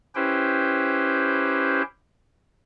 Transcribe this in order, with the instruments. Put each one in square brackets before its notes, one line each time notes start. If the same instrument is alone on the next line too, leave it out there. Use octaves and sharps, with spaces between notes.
[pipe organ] C#4 E4 G4 B4 C5 G5